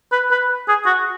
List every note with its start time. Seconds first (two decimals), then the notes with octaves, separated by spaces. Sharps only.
0.12 B4
0.31 B4
0.68 G#4
0.86 F#4